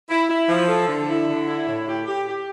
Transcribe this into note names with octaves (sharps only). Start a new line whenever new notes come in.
E4
E4
F3
A4
D3
E4
D3
E4
A2
G4
G4
G4